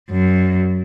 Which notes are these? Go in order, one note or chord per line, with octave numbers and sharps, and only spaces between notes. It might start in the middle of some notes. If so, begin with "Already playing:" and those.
F#2